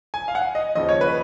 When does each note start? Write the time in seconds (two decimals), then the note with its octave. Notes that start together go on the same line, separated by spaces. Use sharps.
0.14 G#5
0.28 F5
0.35 F#5
0.55 D#5
0.75 D#2 C#3 F3 D#5
0.89 C#5
1.01 B4